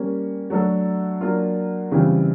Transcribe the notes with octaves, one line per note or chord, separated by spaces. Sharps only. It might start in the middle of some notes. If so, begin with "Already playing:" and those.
Already playing: G3 A#3 C#4
F#3 A3 D4 F#4 A4
F#3 A#3 D4 F4
C#3 E3 G3 C4 F4